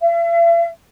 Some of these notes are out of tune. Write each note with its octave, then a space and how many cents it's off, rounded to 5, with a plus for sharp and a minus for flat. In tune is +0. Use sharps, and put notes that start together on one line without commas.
E5 +45